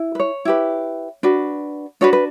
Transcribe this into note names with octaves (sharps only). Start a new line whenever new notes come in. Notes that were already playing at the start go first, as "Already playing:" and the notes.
Already playing: E4
B4
C#5
E4 G4 B4
D4 F#4 B4
D4 F#4 B4 C#5
B4